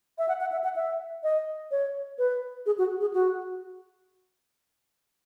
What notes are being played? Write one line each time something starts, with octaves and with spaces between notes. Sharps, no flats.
E5
F#5
F#5
E5
F#5
E5
D#5
C#5
B4
G#4
F#4
G#4
F#4